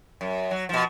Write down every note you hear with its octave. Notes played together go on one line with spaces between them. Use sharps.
F#2
F#3
B2 F3